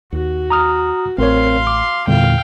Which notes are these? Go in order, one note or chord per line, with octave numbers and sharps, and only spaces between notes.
D#2 F#4
A#5 D#6 F6
A1 C4 A#4 C#5 F5 C6
D6
E2 A#2 D3 G3 F5 G5